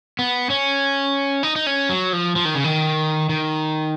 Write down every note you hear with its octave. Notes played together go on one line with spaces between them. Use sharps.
B3
C#4
D#4
D#4
C#4
F#3
F3
F3
D#3
C#3
D#3
D#3